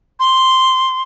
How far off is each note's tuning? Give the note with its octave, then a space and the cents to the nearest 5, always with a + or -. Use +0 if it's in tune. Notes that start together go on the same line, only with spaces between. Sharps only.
C6 +0